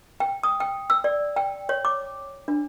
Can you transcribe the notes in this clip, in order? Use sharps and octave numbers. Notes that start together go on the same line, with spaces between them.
G5
D#6
G5
E6
D5
G5
C#5
D6
D4